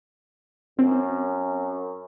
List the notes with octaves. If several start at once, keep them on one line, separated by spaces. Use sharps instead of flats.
F#2 C4